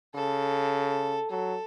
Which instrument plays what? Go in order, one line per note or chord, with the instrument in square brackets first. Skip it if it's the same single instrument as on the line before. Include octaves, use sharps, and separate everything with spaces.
[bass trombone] C#3 [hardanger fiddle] A4
[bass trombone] F#3 [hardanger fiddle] A4